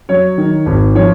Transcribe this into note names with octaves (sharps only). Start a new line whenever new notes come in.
F#3 C#5
D#3
G#1
F3 C#5